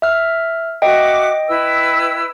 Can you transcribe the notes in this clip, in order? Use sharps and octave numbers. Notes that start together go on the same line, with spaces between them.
E5 F6
F#4 D#5 E5 G5 D6
E4 B4 E6